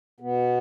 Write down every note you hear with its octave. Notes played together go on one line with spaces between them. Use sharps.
B2 B3